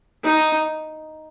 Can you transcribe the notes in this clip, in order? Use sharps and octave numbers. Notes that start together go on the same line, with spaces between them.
D#4